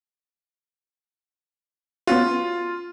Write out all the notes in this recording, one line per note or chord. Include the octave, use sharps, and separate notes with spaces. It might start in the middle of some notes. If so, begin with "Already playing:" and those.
B3 C#4 F4 F#4